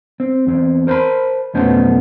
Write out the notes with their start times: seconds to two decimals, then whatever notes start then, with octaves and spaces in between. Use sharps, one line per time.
0.20 C4
0.47 E2 C4
0.87 A#4 C5 F#5 A5 B5
1.54 B1 F2 A3 B3 C#4 C5